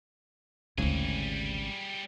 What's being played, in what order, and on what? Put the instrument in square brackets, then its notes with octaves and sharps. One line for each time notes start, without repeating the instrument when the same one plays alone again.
[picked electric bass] G#1 G#2 C#3 [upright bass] D2 E4 [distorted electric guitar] G3 G#4